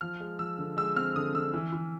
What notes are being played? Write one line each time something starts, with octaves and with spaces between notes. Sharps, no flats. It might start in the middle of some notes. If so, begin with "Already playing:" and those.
F3 F6
G#3
F3 E6
D3
G#3 E6
C4 F6
D3 D#6
D3 E6
E3
E3